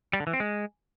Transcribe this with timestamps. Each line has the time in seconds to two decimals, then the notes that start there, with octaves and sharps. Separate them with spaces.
0.13 G3
0.20 D3
0.27 E3
0.33 C4
0.40 G#3